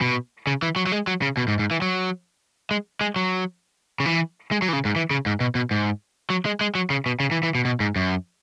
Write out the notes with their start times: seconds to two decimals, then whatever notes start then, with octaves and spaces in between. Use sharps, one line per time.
0.01 B2
0.47 C#3
0.62 E3
0.76 F#3
0.86 F#3
0.92 G#3
1.07 F#3
1.22 C#3
1.37 B2
1.48 G#2
1.59 G#2
1.71 E3
1.82 F#3
2.71 G#3
3.01 G#3
3.16 F#3
4.00 C#3
4.06 E3
4.52 G#3
4.62 F#3
4.68 E3
4.73 C#3
4.85 G#2
4.96 E3
5.11 C#3
5.26 G#2
5.40 B2
5.55 B2
5.71 G#2
6.30 F#3
6.45 G#3
6.61 G#3
6.75 F#3
6.90 C#3
7.06 B2
7.20 C#3
7.31 E3
7.43 E3
7.55 B2
7.65 B2
7.80 G#2
7.96 F#2